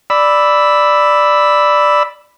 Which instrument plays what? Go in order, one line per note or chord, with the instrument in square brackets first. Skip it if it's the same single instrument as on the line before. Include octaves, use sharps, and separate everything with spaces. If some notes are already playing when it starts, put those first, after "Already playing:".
[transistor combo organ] D5 B5 E6